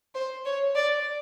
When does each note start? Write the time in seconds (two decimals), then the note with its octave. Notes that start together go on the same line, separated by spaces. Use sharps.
0.15 C5
0.45 C#5
0.75 D5